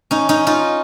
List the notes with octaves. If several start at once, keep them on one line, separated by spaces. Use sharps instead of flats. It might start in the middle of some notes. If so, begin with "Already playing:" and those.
C#4 D#4
C#4 D#4
D#4 F4